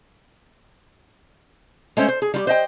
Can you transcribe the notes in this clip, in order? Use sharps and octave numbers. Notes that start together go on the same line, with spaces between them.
G#3 A3 C#4 C5
C5
G#4
G3 F4 G4
C5 D#5 G5